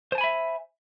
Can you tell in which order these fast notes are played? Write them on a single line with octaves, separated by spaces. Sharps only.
C5 A5 G#5 B5 E5